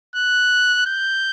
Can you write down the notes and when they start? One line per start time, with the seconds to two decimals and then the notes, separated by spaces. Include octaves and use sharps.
0.16 F#6
0.86 G6